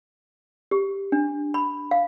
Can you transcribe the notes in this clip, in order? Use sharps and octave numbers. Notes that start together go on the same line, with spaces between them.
G4
D4
B5
F5